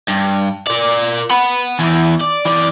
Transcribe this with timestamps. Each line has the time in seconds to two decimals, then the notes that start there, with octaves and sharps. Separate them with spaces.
0.08 G2
0.67 A#4 D5
1.30 F#5 B5
1.79 E2 E3
2.20 D5
2.45 E3 D5